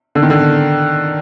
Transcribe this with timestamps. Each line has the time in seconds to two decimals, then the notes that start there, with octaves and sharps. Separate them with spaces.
0.15 D3
0.23 D#3
0.30 D3